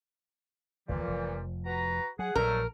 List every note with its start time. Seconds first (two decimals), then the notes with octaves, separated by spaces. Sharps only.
0.89 F1 D2 A#2 E3 G3
1.03 F1 F3
1.66 F#4 B4 A#5
2.19 F#3 G#4 F#5
2.36 A#1 G2 A#2 F3 F#3 A3 A#4